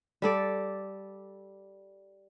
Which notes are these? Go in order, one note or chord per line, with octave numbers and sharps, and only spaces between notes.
G3 A4 D5